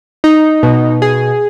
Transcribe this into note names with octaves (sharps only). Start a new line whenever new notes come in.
D#4
B2
G#4